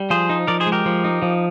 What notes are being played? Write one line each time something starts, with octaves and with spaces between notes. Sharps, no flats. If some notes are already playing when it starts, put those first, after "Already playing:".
Already playing: G3
F3 G#4 C5
D#4
F3 A#4 D5
G#4 C5
G#3
G4 A#4
F3
D#4
F3